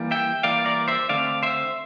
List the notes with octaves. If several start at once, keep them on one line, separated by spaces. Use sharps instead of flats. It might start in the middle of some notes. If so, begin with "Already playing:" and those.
Already playing: E3 G3 A#3
E5 G5
E3 G3 A#3 D5 F5
A#4 D5
C5 E5
D3 A3 C4 D5 F5
C5 E5